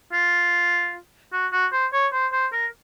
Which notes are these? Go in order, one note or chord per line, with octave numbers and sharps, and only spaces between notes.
F4
F#4
F#4
C5
C#5
C5
C5
A#4